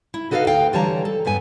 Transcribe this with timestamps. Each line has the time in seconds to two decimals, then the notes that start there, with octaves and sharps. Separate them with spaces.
0.14 E4
0.31 D#4 F#4 A4 B4 D#5 F5
0.47 D2 F5 G5
0.73 D3 E3 G3 C#5 A5 A#5
1.05 A4
1.25 E2 G2 B3 G#5